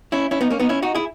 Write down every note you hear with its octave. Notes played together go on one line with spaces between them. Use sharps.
C#4 E4
C#4 E4
B3 D#4
A#3 C#4
B3 D#4
C#4 E4
D#4 F#4
E4 G#4